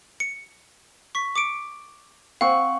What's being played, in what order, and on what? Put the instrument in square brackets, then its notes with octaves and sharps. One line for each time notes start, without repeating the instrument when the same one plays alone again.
[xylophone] C#7
C#6 B6
D6 C#7 D7
[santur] C4 F#5 C#6 [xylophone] F5